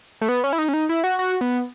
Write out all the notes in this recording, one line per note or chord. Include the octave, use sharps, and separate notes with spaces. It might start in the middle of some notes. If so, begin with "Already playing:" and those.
A3
B3
C#4
E4
D#4
C#4
D#4
E4
F#4
F#4
B3